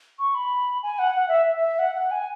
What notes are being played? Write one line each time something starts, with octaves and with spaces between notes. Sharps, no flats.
C#6
B5
G#5
F#5
F#5
E5
E5
F#5
F#5
G#5